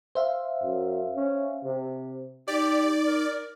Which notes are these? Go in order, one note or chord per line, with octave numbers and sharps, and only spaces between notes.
C5 E5 F5
F#2
C#4
C3
D#4 G4 D5
A#4